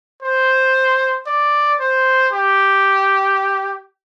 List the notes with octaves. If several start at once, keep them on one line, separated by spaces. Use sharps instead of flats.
C5
D5
C5
G4